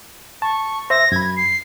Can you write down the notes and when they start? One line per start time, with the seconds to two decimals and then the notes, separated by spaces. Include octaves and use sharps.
0.42 A5 C#6
0.90 C5 E5 A#6
1.12 F#2 B5 G#6
1.37 C7